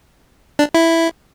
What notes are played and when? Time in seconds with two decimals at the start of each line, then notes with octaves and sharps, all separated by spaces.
0.59 D4
0.75 E4